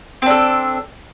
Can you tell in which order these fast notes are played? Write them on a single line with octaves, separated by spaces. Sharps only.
C4 D4 A4